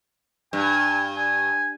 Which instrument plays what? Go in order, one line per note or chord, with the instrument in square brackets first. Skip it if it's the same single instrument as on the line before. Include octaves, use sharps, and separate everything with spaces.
[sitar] G2 [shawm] G#5
[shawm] G#5